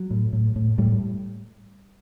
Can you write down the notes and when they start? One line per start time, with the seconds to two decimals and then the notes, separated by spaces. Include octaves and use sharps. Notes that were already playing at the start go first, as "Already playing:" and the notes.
Already playing: F#3
0.11 A2
0.33 A2
0.56 A2
0.78 A2 G3